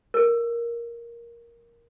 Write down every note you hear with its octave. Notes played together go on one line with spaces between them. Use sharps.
A4 A#4